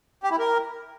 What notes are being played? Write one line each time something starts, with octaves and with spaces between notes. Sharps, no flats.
G4
E4
A#4